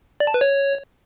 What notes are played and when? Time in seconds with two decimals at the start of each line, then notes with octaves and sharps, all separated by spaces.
0.20 D5
0.27 A5
0.34 B4
0.41 C#5